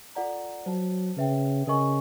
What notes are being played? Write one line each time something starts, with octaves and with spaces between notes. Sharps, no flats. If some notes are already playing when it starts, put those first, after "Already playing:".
F4 A4 D5 F#5 A#5
F#3 C5 F5 A5
C#3 B4 E5 G5
C#3 A#4 D#5 G#5 C#6